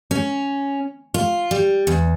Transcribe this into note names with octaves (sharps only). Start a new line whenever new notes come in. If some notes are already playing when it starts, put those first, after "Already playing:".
C#4
F4
G3
E2